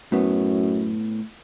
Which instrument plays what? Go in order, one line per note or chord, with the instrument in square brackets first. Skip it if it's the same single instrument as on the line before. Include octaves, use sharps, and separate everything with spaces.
[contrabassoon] F#2 [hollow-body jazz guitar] A2 B3